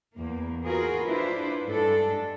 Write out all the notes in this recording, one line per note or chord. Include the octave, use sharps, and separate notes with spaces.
E2 A#3
F4 F#4 G#4 A#4 B4
D4 E4 F4 B4 C5
G2 G#3 D4 A4